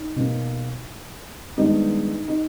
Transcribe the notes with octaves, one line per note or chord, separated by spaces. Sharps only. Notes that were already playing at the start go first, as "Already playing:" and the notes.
Already playing: D#4
B2 A#3
G2 D#3 G#3 B3 D#4
D#4